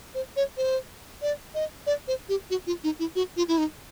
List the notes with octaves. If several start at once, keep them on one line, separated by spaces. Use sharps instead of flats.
C5
C#5
C5
D5
D#5
D5
C5
G4
F#4
F4
D#4
E4
F#4
F4
E4
D#4